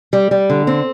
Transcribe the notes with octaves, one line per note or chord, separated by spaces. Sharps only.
G3
G3
D3
C4